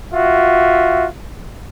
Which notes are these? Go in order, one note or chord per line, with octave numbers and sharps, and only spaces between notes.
F4 F#4 E5